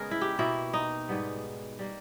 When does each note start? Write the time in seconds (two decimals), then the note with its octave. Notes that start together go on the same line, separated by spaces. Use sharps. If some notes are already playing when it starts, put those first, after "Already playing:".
Already playing: C#3 G#3 B3 G#4 A#4
0.11 E4
0.21 G4
0.39 B2 A#3 E4
0.74 D#4
1.08 G#2 G3 B3
1.79 G3 A#3